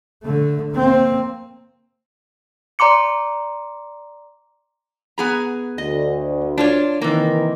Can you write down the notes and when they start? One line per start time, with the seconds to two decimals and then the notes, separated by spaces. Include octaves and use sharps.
0.24 D3 A3
0.73 A#3 C4
2.79 D5 A#5 C6 D6 C#7
5.18 B3 G#4 A#5
5.78 D2 D#5
6.58 D4 F4 C#5
7.01 C3 D#3 E3 A#3